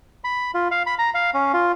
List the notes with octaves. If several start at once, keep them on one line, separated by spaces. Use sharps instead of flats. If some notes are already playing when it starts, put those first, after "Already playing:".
B5
F4
F5
B5
A#5
F5
C#4
F4